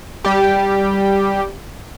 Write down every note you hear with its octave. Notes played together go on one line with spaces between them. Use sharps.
G3 G4